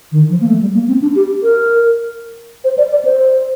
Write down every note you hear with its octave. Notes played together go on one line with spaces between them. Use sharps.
D#3
F3
A#3
A3
G3
A#3
C4
D4
G4
A#4
C5
D5
D5
C5